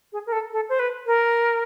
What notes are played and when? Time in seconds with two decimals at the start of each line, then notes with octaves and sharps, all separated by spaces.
0.13 G#4
0.26 A#4
0.32 A4
0.53 A4
0.69 C5
0.79 B4
1.07 A#4